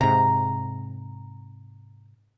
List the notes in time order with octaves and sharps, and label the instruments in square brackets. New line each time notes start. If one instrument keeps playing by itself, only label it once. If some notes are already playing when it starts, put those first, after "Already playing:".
[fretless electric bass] G#2 C3 [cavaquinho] A#5